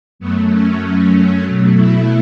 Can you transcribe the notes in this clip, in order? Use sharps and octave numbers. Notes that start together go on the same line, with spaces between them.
F#2 F#3 A3 B3
C#4
C#4
B2 F#3 A3
E4